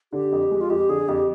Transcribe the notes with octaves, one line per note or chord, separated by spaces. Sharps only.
D3 G4
F2
G#3
F4
F2 G4
D3 G#4
F2 G4